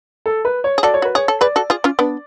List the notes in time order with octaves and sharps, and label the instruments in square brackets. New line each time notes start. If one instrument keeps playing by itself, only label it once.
[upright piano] A4
B4
C#5
[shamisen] G#4
[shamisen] F#4 A4 [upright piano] D5
[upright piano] C#5
[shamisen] F#4 [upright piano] B4
[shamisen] G#4 [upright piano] C#5
[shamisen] A4
[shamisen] G#4 B4 [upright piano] D5
[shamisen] F#4 A4
F4 G#4
C#4 F4
B3 D4